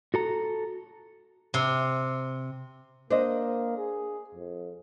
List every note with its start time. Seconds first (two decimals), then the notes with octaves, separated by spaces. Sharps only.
0.14 F#4 A4 A#5
1.54 C3
3.10 A#3 D4 C5 D#5
3.78 G#4
4.35 F2